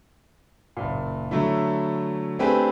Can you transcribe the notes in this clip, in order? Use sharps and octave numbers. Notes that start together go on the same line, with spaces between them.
F#1 A#2
D3 F#3 A3 E4
A3 C4 D4 G4 G#4 B4